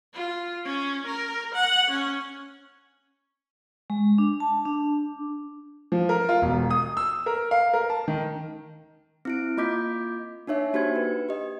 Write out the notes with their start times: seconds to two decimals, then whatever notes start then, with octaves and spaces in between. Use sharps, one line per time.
0.14 F4
0.65 C#4
1.06 A#4
1.55 F#5
1.90 C#4
3.90 G#3
4.18 D4
4.40 A5
4.65 D4
5.92 F3
6.09 A#4
6.29 F4
6.42 E1
6.70 D#6
6.97 E6
7.26 A#4
7.51 F5
7.73 A#4
7.90 A5
8.08 D#3
9.25 C4 E4 D7
9.57 A#3 F4 D#5 D6 G6 B6
10.47 D4 D#4 C#5 E5
10.74 A#3 D4 F#4 G4 C5 G#6
10.96 B4
11.29 G4 D#5